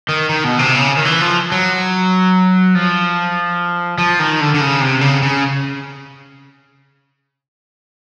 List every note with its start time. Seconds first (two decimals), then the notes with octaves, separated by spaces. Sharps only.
0.09 D#3
0.29 D#3
0.44 B2
0.59 C3
0.75 C#3
0.97 D#3
1.05 E3
1.21 F3
1.52 F#3
2.75 F3
3.98 F3
4.19 D#3
4.40 D3
4.54 D3
4.61 C#3
4.81 C3
5.01 C#3
5.22 C#3